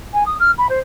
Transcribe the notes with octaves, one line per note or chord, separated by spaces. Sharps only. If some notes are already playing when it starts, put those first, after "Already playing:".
G#5
D#6
F6
B5
C5